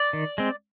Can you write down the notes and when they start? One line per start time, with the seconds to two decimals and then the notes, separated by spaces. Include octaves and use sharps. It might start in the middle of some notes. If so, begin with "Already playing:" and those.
Already playing: D5
0.13 D#3
0.38 G#3 C4